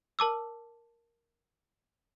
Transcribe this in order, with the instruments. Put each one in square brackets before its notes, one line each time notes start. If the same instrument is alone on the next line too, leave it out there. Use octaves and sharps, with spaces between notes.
[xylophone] A#4 A5 D6 E6